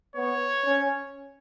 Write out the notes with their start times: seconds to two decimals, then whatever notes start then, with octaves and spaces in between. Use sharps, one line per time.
0.16 B3 C#5
0.66 C#4